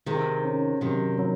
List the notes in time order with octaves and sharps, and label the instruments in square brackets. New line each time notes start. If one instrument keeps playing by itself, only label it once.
[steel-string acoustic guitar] C3 D#3 [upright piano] G#4
[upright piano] C#4
[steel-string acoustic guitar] C3 D#3 [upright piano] F#3
[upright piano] F#3